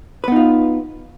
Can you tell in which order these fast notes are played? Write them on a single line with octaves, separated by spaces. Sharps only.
B4 B3 D#4 F4